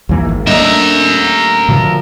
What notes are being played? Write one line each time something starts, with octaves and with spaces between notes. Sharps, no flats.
D#2 E3 A#3
G#1
A3 A#3 D4 A#4 D#5 E5
B2 D3 F3